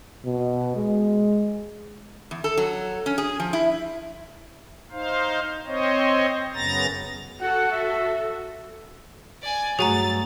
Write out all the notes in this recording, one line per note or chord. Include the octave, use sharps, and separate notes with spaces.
B2
G#3
E2
A4
F#3
C#4
G#4
F3
E4
D#4 C5 F5
C4 C5 C#5 D#5
F#2 C#3 B3 A#5 A6 A#6
F#4 A4 F#5
E5
D5 G#5
G2 F#3 A3 G#4 G#5 A#5 A6